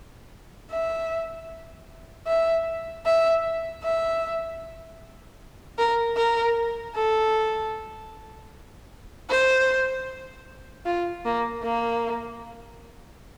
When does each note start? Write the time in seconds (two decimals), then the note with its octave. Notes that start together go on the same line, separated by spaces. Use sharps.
0.71 E5
2.27 E5
3.05 E5
3.83 E5
5.79 A#4
6.17 A#4
6.95 A4
9.30 C5
10.86 F4
11.25 A#3
11.63 A#3